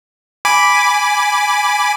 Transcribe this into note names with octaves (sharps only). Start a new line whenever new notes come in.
G#5 B5 D6